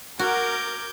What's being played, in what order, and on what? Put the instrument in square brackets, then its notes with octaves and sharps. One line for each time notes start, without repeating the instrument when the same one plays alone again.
[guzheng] F#4 [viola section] A#4 [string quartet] D6 G6 G#6